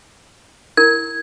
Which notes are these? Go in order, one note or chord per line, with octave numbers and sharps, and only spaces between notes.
E4 A#4 G#6